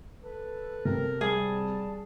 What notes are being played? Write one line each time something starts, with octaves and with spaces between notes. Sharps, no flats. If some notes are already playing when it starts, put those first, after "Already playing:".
A4 B4
C3 A#4
G3 G#4 A5